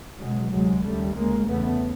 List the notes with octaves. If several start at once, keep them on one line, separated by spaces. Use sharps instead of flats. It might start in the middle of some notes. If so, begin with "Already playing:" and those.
C#2 B2 F#3 G#3
D2 C3 F#3 G#3
D#2 C#3 G3 A3
D2 C#3 G#3 A#3
E2 C#3 A3 B3